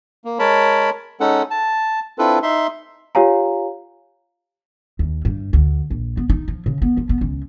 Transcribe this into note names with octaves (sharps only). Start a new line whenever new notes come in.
A#3
G#3 A#4 C#5 A5 B5
G#3 C#4 D#4 A4 F#5
A5
C4 D4 E4 F4 A4 B4
D#4 E5 C6
F4 G4 C#5 F5 G#5 A#5
D#2
G2
D2
A#1
B3
D#4
F3
C#3
B3
F3
B3
C#2